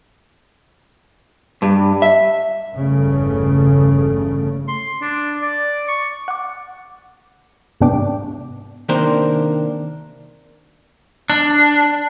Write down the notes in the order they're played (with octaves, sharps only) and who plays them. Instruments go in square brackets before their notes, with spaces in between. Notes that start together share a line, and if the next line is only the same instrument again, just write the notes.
[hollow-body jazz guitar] G2
E5
[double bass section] G1 E2 C#3 A3
[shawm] C6
D4
D5
C#6
[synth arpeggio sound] F#5 D6
G#2 C3 B3 D4 G5 D6
[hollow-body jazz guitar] C3 D#3 A#3 D4 A#4 C5
[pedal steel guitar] D4